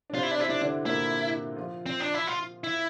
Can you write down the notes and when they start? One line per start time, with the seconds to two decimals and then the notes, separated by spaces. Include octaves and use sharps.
0.10 D4
0.15 C3 C4 F4
0.23 E4
0.31 D4
0.38 C3 C4 E4
0.50 D4 E4
0.61 D3 D4
0.86 A#2 A#3 E4
1.56 F3 F4
1.86 C4
2.00 D4
2.14 E4
2.27 F4
2.64 E4